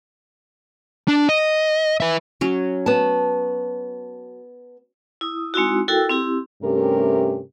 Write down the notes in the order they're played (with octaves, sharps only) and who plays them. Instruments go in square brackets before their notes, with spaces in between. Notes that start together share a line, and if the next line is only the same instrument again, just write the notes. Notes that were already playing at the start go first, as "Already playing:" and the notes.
[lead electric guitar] D4
D#5
B4 E5
[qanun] F#3 C#4
[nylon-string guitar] B3 A5
[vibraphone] E4 D#6
G#3 C4 D#4 E4 F#4
E4 F#4 A4 A#4 G5 E6
C4 E4 G4
[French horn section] G2 C3 A3 C#4 G4 A#4